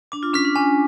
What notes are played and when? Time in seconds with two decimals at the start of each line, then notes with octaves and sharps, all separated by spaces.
0.12 D4 D6
0.23 F4
0.33 C#4 F6 B6
0.45 D4
0.56 C#4 G#5